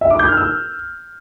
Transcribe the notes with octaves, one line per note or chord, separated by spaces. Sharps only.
E5
D6
G6
F6
E6